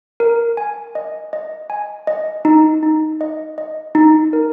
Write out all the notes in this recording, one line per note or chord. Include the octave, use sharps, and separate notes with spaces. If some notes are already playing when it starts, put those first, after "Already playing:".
A#4
G#5
D#5
D#5
G#5
D#5
D#4
D#4
D#5
D#5
D#4
A#4